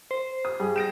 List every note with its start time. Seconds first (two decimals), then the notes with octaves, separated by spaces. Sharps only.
0.11 C5
0.45 D#6
0.60 G2 G3 G#4
0.76 G4 A#6 D7 E7